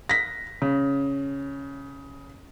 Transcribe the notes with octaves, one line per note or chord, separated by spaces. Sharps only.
A#6 B6
C#3